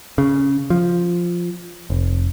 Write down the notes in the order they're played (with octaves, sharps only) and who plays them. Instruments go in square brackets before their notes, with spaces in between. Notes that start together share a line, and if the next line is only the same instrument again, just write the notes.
[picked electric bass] C#3
F3
F1